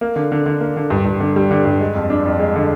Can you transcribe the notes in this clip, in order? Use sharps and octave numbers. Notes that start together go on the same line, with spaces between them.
A#3
D3
D3
D3
A#3
D3
G2
G2
D3
G3
D3
G2
G#3
F2
D4
F2
G#3
D3